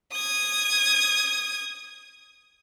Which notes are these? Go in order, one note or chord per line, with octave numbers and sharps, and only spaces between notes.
D#6 G#6